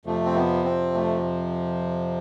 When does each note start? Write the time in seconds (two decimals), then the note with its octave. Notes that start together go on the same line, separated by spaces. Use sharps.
0.05 F2 C3 F3 A3
0.25 C4
0.35 B3
0.65 C4
0.94 A3